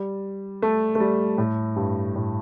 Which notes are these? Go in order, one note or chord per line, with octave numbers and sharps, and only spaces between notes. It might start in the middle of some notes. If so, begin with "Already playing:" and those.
Already playing: G3
A3
A3
G3
A2
G2
A2